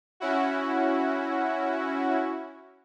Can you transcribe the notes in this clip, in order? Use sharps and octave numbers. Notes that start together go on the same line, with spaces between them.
C#4 E4 F#4